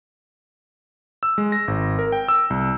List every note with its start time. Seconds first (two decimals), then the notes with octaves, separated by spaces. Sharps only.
1.23 E6
1.38 G#3
1.52 A#6
1.68 G#1
1.99 A#4
2.12 G5
2.28 E6
2.50 C2